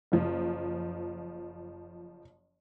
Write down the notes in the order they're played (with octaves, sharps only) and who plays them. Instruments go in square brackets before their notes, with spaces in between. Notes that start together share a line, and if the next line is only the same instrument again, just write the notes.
[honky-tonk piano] F#1 F3